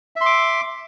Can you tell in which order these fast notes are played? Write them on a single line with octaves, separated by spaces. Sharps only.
E5 C6 D6